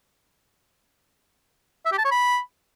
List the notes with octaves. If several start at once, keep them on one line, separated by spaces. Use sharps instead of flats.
E5
G4
A5
C#5
B5